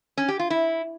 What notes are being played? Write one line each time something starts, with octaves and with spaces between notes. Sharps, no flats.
C#4
G4
F4
E4